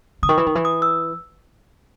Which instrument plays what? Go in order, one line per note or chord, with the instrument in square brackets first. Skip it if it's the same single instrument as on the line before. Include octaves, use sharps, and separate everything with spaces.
[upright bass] C#3 [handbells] D#6
[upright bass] D#3 [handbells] C#6
[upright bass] E3
D#3
E3
[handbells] D#6
E6